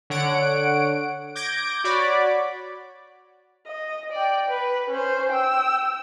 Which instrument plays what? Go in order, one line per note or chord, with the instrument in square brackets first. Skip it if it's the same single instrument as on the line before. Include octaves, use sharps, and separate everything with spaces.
[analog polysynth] D3 C#5 F#5 D7
D6 G6 G#6 A#6 D7
F#4 C#5 D5 B5 D6
[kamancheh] D#5
D5 G5
B4
C#4 C5
G5 E6